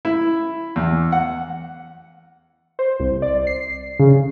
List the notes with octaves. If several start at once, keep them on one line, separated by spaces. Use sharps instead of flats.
E4
E2
F#5
C5
C2
D5
C7
C#3